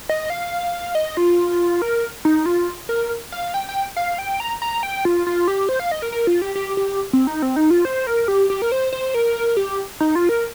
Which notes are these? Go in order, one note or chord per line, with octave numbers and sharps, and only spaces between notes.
D#5
F5
D#5
F4
A#4
D#4
F4
A#4
F5
G5
G5
F5
G5
A#5
A#5
G5
F4
F4
G4
C5
F5
D#5
A#4
A#4
F4
G4
G4
G4
C4
D#4
C4
D#4
F4
C5
A#4
G4
G4
A#4
C5
C5
A#4
G4
D#4
F4
A#4